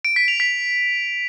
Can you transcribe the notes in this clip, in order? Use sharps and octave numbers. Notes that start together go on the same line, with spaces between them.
D7
B6
F7
B6